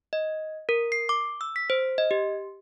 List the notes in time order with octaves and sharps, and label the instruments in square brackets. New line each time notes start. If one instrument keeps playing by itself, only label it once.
[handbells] D#5
A#4
C7
D6
E6
B6
C5
D#5
G4